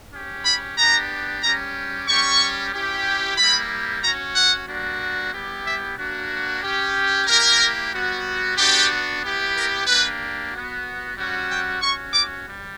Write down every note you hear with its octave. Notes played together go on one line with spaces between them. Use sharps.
C#4 G4
B5
B3 D4 G4 A#5
G3 C#4 G4 A#5
G3 C#4 G4 C#6
C#4 E4 G4
G3 A#3 E4 G4 B5
C#4 F#4 A#5
F#5
G3 A#3 D4 F#4
G3 B3 E4 G4
E5
A#3 D4 F#4
C#4 G4
A#3 E4 G4 A#4
G3 B3 F#4
B3 D4 F#4 G4
B3 E4 G4
A#4
A#3 D4 G4 B4
B3 F#4
G3 C#4 F#4
G5
C#4 F#4 C#6
D6
G3